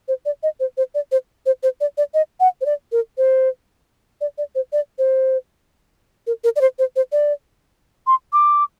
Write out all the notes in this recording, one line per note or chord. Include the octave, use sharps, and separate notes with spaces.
C5
D5
D#5
C5
C5
D5
C5
C5
C5
D5
D5
D#5
F#5
C5
D5
A#4
C5
D5
D5
C5
D5
C5
A#4
A#4
D5
C5
C5
C5
D5
C6
D6